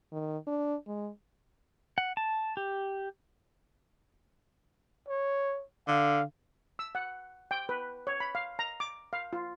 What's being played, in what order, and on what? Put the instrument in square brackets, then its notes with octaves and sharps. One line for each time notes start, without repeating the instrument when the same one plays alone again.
[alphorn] D#3
D4
G#3
[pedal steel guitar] F#5
A5
G4
[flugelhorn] C#5
[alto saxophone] D3 [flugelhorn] F5
[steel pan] E6
F#5
G5
B4
C#5
B5
F5
A#5
D6
F5
F4